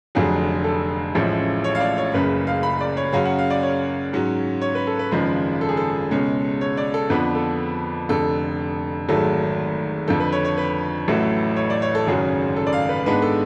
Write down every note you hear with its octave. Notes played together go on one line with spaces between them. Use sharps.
F1 F2 D3 F#3 G#4
A4
A1 A2 F3 G#3 C#4
C#5
F5
D5
C#5
F#1 F#2 C#3 B4
F5
B5
D5
C#5
F#2 C#3 F#3 C#4 F5
F#5
F5
D5
C#5
G#2 F#3 C#4
C#5
B4
A4
B4
G#1 F#2 C#3 F3 G#3
A4
G#4
A4
C#2 B2 G#3 C#4
C#5
D5
A4
F2 D3 F3 B3 D4 B4
A4
F1 F2 D3 A4
G#1 G#2 F#3 A3 A4
F2 D3 F3 A4
B4
C#5
C#5
B4
A1 A2 F#3 A3
C#5
D5
C#5
A4
G#1 F#2 C#3 F#3 C#4 G#4
A4
D5
F5
B4
G#2 G#3 B3 D4 B4
A4